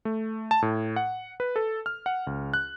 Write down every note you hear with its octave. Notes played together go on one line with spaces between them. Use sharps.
A3
A5
A2
F#5
B4
A4
F6
F#5
C#2
F#6